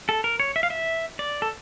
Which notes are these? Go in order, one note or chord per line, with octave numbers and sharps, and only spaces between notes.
A4
A#4
C#5
E5
F5
E5
D5
A4